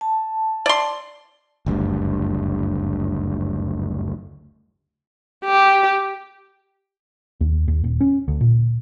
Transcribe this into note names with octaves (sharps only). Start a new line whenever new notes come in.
A5
D5 C6
F#1 D2 G2
G4
D#2
D#2
D#1
C#4
D2
A#2